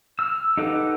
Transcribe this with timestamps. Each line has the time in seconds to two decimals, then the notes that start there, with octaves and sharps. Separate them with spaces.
0.19 E6 F6
0.57 D#4 G4 A4 B4 F#5